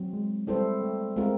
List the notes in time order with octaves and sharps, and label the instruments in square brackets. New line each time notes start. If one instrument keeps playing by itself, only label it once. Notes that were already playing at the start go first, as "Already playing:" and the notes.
Already playing: [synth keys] F#3 C4
G#3
[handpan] G3 C4 E4 A4 C5
[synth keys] A3
A3
A3
[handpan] G#3 C4 F4 A#4 [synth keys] A3